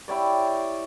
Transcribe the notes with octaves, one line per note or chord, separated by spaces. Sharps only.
E4 G4 C#5 D5